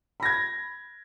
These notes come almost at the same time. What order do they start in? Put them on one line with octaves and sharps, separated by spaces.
B5 A#6 G#6